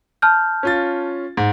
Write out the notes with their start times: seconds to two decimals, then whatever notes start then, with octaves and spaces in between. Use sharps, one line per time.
0.22 A5 F6 G6
0.63 C#4 F4 A6
1.37 G#2